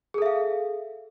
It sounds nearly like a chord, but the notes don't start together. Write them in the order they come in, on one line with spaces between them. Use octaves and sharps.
G#4 A4 E5 F5